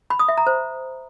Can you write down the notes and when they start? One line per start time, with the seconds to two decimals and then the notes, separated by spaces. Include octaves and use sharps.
0.10 B5
0.19 D#6
0.28 E5
0.38 A#5
0.47 C5